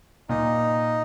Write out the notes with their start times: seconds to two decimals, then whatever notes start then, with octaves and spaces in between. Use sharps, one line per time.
0.29 A#2 D#4